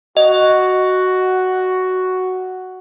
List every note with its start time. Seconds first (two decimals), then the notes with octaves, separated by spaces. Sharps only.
0.17 F#4 D#5